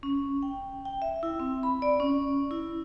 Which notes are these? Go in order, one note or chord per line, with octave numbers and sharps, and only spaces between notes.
C#4
G5
G5
E5
E4
C4
B5
D5
C#4
E4